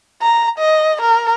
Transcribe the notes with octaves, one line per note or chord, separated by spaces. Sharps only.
A#5
D#5
A#4